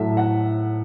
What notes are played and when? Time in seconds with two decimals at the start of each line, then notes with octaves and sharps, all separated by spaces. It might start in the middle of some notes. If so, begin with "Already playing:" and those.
Already playing: A2 F#3 A3 E5
0.17 F#5